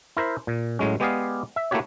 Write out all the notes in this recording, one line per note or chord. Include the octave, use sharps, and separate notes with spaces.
E4 A#4 C5 E5
A#2
A2 F#3 G#3 C#4
G#3 B3 G4 G#4 D5 F5
E5
A3 A#3 E4 F#4 G4 C#5